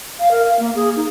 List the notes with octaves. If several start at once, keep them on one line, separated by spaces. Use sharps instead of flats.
F5
A#4
F5
A#3
G#4
D#4